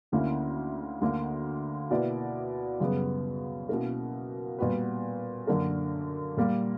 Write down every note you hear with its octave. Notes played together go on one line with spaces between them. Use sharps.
D2 D3 A#3 C#4 E4
D2 D3 A#3
B2 A#3 E4 B4 D5
F#2 C#3 G3 B3
B2 A#3 C#4 E4 A#4
A#2 G3 B3 F#4 B4
F#2 D3 A#3 D4 A#4
A#2 G3 A#3